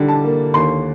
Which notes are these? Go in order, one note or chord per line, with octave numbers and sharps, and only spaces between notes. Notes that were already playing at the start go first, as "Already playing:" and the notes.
Already playing: D3 G3
A5
A#3
D#2 C6